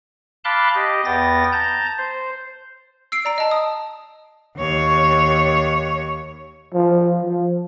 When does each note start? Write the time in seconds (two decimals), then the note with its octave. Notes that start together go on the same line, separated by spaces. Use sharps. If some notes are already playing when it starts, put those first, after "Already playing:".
0.44 F5 A5 B5 C6 D6 F#6
0.75 G4 D#5
1.05 E2 B3 G5 A6 A#6
1.53 A5 A#5 G6
1.98 C5
3.12 E6 C7 D7
3.25 D5 A#5 D7
3.38 D#5 A5
3.51 D#6
4.57 D#2 C#5
6.74 F3
7.23 F3